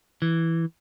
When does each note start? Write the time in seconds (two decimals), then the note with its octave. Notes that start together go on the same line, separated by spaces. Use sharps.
0.22 E3